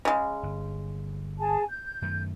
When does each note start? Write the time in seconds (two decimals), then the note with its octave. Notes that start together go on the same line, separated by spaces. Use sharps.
0.05 C#3 G#3
0.43 G1
1.39 G#4 G#5 A5
1.69 G6
2.02 F#2 D#3 A3